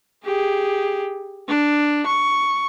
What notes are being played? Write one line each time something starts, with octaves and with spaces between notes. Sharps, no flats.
G4 G#4
D4
C#6